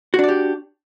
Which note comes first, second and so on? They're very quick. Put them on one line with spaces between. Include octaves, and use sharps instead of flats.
F#4 D4 D5 G4